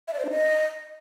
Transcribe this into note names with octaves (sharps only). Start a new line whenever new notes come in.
E5
D5
C5
D4
D#5